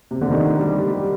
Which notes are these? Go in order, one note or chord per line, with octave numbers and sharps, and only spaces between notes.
C3
D3
D#3
G3
G3